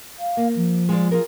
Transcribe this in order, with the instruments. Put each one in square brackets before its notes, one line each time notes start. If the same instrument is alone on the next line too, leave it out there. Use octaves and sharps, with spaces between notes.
[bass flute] F5
[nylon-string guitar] A#3
[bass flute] F3
[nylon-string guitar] G#3 F4 D5
F4 G#4 A#4